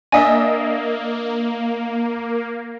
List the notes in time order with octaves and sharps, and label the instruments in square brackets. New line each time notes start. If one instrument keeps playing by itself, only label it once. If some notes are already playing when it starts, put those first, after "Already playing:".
[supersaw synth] A#3 [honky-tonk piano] D4 D#5 E5 [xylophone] G#5